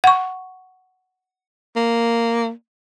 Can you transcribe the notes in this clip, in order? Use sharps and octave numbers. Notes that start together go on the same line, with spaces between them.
F#5 C#6
A#3